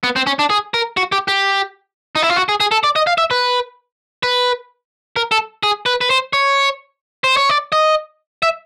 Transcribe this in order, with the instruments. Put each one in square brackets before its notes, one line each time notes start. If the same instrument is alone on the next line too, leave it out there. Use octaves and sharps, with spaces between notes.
[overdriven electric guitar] B3
C4
C#4
D4
G#4
A#4
F#4
G4
G4
D#4
E4
F4
F#4
G#4
G#4
A4
D5
D#5
F5
E5
B4
B4
A#4
A4
G#4
B4
B4
C5
C#5
C5
C#5
D5
D#5
E5